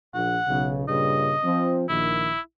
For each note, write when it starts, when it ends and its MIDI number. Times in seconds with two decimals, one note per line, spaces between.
0.14 0.38 34
0.14 0.73 78
0.48 0.86 35
0.48 0.86 49
0.88 1.35 43
0.88 1.35 46
0.88 1.35 49
0.88 1.76 75
1.44 1.84 53
1.44 1.84 60
1.89 2.33 34
1.89 2.33 51
1.89 2.40 64